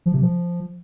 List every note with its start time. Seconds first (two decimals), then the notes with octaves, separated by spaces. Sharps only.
0.06 F3
0.14 C3
0.22 F3